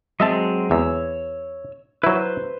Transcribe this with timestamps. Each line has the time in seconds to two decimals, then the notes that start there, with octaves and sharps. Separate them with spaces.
0.20 F#3 G#3 C4 D#5 E5 A5
0.71 E2 C#5 E6
2.03 F#3 E4 B4 C5